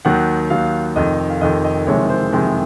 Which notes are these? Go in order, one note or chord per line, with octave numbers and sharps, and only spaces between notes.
D#2 D#3 F#3 F#5
D#2 D#3 F#3 F5
F1 F2 D#3 D#5
F5
F1 F2 D#3 D#5
D#5
F#1 F2 C3 D#3 G#3 C#5
C5
F#1 F2 C3 D#3 G#3